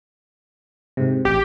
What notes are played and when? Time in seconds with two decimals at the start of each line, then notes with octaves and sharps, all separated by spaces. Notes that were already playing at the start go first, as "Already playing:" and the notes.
0.97 G#2 C3
1.25 A1 G4